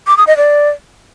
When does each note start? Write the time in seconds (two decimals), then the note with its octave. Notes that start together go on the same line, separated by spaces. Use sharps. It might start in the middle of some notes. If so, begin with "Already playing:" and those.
0.07 D6
0.17 D#6
0.27 D#5
0.37 D5